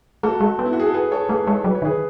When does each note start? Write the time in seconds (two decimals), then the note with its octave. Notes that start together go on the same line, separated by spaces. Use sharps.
0.23 A3 F#4 A4
0.40 G#3
0.59 B3
0.66 E4
0.73 F#4
0.80 G#4
0.86 A4
0.94 G#4 B4
1.12 A4 C#5
1.29 A3 G#4 B4
1.47 G#3 A4 C#5
1.64 F#3 B4
1.75 C#5
1.82 D#3
1.85 G#4 B4